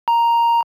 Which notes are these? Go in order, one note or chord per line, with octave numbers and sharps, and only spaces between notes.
A#5